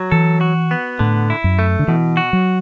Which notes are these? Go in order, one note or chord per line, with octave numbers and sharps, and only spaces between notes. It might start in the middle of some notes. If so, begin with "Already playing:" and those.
Already playing: F#3
E3 A4
F#4
B3
A2 D3
E4
F#2
A3
D3
B2 E3
F#4
F#3